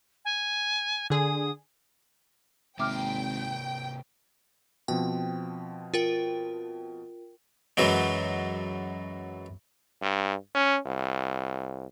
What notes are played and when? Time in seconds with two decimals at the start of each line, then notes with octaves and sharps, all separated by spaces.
0.25 G#5
1.10 D3 G#4 D#6
2.79 G#1 C3 A#3 E5 G5 A#5 D6 F6
4.88 B2 F3 C4 G5
5.94 F4 A#4 G5
7.77 F#2 E3 F#3 G#3
10.02 G2
10.55 C#4
10.86 C2